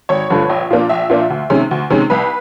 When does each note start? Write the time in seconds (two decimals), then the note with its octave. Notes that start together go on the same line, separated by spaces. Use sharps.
0.09 G#1 C#5
0.30 G2 D3 F3 A3
0.49 A#1
0.70 A#2 F3 A#3 D4
0.89 A#1 E5
1.09 A#2 F3 A#3 D4
1.30 D2
1.50 C3 D#3 G#3 C#4
1.71 D2
1.90 C3 D#3 G#3 C#4
2.10 C2 B4